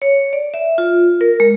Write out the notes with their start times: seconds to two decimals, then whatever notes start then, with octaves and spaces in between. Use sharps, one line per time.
0.02 C#5
0.33 D5
0.54 E5
0.78 F4
1.21 A#4
1.40 G#3